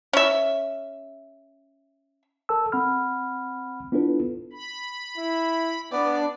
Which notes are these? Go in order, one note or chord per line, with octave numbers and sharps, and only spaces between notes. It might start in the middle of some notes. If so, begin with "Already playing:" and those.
C#4 E5
A4 A#4 A5 E6
C4 F#5 B5 F6
B3 D4 E4 F4 A4 B4
B5
E4
B3 D4 D5